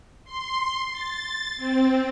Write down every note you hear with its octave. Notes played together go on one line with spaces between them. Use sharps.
C6
A6
C4